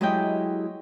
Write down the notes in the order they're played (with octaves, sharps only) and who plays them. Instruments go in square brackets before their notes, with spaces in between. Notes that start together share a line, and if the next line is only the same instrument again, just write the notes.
[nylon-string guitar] F#3 G#3 E4 G4 D#5 G5